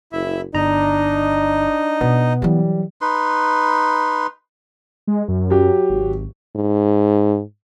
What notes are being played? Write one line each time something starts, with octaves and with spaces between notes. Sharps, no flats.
F#1 E4 E5
G1 D4 D#4 D#5 A#5
B2 B3
E3 F#3 G3
D#4 B4 C6
G#3
F#2
F#3 G4
G#1
G#2